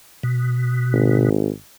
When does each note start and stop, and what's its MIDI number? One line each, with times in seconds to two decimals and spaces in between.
0.23 1.29 47
0.93 1.49 32